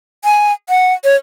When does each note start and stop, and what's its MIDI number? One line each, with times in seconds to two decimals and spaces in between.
0.24 0.52 80
0.69 0.93 78
1.04 1.15 73